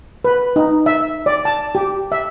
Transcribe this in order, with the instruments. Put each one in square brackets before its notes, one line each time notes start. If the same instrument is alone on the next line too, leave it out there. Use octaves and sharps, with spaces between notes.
[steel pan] B4
D#4
E5
D5
A5
G4
E5